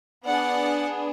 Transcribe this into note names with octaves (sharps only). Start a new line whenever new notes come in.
B3 D4 G#4 D5 F#5